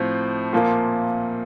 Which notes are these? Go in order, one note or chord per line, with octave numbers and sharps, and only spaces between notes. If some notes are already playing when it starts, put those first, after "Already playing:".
Already playing: A2 F3 C4
A#2 F3 A#3